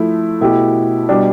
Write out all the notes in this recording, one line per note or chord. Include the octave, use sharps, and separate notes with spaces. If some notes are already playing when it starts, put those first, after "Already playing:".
Already playing: F3 A3 E4
B2 A3 E4 G4
B2 G3 D4